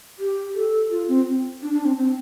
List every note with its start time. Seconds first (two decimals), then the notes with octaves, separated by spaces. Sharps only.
0.19 G4
0.55 A4
0.90 F4
1.08 C4
1.62 D4
1.73 D4
1.85 C4
1.97 C4